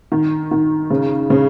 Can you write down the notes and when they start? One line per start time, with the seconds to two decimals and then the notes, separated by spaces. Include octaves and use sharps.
0.12 D#3
0.51 D#3
0.90 C#3
1.30 C#3